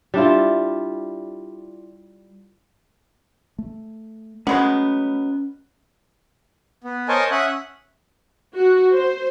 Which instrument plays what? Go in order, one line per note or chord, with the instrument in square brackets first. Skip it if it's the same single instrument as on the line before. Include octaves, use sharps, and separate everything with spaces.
[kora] G3 D4 E4 F4
[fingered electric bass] A3
[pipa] F#3 G#3 B3 [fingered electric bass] A3 [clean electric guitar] C#4 B5
[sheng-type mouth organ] B3
A#4 C5 C#5 D#5 G#5 A5
C#4 E5 F#5 D#6 F#6
[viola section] F#4
C5